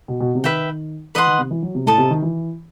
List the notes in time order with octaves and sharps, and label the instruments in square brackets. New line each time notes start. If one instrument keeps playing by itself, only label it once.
[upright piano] B2
B2
C3
[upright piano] D#3 [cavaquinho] B4 E5 G5
[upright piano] E3 [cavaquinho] B4 D#5 F#5 C6
[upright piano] D#3
C3
E3
F#3
C3
[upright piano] A2 [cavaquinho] A4 D#5 A5
[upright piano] C3
D#3
E3